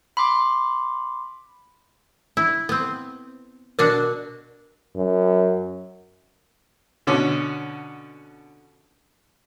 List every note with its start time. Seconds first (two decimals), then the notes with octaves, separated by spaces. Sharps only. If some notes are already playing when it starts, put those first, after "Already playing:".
0.17 B5 C6 D6
2.37 E4
2.69 B3 C4
3.79 B2 D4 F#4 A#4
4.96 F#2
7.07 B2 D3 C#4